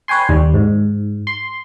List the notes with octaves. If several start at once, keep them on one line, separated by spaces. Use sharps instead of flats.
B4 C#5 G5 G#5 C6
D#2 G3
G#2
C6